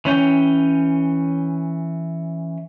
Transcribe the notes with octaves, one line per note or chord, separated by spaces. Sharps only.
E3 C#4 G5